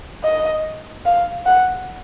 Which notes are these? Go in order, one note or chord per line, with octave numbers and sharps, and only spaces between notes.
D#5
F5
F#5